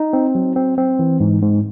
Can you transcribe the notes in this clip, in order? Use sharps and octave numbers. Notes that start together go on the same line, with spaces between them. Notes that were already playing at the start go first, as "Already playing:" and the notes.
Already playing: D#4
C4
F#3
C4
C4
E3
G#2
G#2